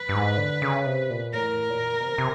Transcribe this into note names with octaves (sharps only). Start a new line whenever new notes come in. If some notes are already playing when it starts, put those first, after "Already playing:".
Already playing: B4
G2
G#2
D3
C#3
C3
A#2
A2 A#4
A#2
B2
C3
C3